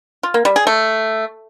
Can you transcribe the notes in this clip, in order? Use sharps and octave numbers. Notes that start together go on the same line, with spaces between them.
F4
A#3
G3
G#4
A3